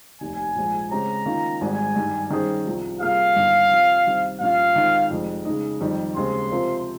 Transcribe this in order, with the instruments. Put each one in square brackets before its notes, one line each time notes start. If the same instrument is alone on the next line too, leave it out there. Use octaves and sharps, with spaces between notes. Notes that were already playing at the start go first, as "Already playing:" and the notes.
[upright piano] F1 D#2 D#3 [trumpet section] G#5
[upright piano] A#1 G#2 F3
[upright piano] C#3 G#3 C4 G4 C#5 [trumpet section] A#5
[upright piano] D#3 A#3 C#4 F4
[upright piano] G#1 G#2 G3 [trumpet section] G#5
[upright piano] G2 D#3 G3
D#3 G3 C#4 G#4 C5
C2 C3 F3
[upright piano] C3 G3 A#3 F4 G#4 [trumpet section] F5
[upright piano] G1 G2 D#3 A#3
C3 F3 C4
C2 C3 D#3 G3 C4
[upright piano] C2 A#2 F3 A#3 C#4 [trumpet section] F5
[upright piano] D#3 G#3 C4 F4
F1 F2 D#3 G#3
C#3 G#3 D#4
F2 D#3 G3
[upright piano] D#2 C#3 G#3 C4 [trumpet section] C6
[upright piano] C3 F3 C4 F4 A#4